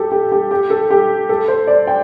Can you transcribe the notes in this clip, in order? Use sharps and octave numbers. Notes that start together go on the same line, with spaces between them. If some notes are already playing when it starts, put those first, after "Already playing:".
Already playing: G4 A4
G4
G4
G4
A4
G4
A4
C5
D5
G5